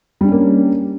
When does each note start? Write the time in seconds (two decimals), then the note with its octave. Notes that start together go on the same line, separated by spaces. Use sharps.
0.21 G3
0.24 D4
0.28 C#4
0.32 A#3